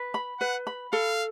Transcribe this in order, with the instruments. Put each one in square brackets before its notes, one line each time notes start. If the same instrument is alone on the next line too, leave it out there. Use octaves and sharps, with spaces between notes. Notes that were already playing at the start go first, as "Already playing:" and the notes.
Already playing: [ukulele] B4
B5
[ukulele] B4 [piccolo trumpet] F#5
[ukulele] B5
[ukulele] A4 [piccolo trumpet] F5